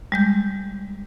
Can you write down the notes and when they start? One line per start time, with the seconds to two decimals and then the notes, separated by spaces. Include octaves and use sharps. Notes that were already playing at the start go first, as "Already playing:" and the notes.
0.12 G3 G#3 G6